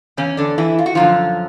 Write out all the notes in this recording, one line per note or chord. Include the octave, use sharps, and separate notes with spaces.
E2 C#3 C#4
D3 D4
E3 E4
F4
F#4
F#2 D3 F3 F4